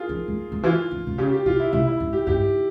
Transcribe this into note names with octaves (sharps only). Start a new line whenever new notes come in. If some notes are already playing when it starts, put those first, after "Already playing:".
Already playing: F4 G#4 A#4
F3
E3
C#3
E3 F4
E3
C3
C#3 G4
G4
C3 F4
E4
C3 E4
E4
G#2
G4
G#2 G4